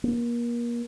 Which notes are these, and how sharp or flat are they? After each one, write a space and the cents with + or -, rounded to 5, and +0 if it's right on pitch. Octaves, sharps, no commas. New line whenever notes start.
A#3 +30